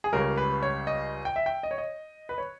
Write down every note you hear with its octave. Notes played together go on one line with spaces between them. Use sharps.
G#4
C#2 C#3 G3 A#4
B4
C#5
D#5
G5
E5
G5
D#5
C#5
D#5
B4
C#5